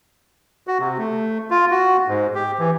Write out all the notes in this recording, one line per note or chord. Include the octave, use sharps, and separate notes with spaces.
F#4
C3
A3
F4
F#4
G#2
G4
E3